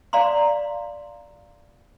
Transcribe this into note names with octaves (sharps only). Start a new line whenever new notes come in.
D5 F5 A#5 C6